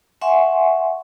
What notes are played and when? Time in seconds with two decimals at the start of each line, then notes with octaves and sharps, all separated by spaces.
0.21 E5 F#5 G#5 C6 C#6